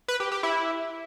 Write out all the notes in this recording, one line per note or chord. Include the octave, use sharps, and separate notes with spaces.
B4
G4
G4
E4